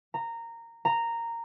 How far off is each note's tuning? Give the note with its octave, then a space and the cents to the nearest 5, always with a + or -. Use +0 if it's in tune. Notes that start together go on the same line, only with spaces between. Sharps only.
A#5 -15
A#5 -10